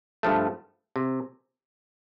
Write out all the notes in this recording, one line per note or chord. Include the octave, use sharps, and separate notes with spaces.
G2 F3 A3
C3